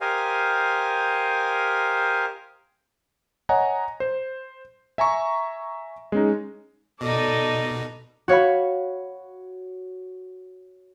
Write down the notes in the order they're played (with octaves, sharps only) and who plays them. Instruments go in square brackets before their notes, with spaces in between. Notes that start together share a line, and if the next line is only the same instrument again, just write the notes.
[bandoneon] G4 A#4 C5 D#5 F5 G#5
[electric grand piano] C#5 D#5 F#5 G#5 A#5
C5
E5 G#5 A#5 C#6
G#3 C#4 D#4
[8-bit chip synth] B2 [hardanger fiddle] D#4 D#5 [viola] A4 D5
[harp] F#4 C#5 F5 B5